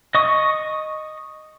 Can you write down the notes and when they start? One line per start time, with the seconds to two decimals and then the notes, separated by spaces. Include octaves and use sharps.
0.15 D#5 C#6 D#6